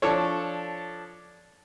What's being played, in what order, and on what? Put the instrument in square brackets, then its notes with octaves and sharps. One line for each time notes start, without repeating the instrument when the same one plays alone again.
[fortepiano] F3 D4 A4 C#5